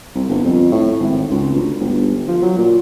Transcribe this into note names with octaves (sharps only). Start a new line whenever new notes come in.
C2
G1
F2
A2
G#1
C#2
D2
G1
F3
F#3
A#2